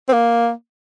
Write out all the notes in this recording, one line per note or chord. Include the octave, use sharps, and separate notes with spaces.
C4
A#3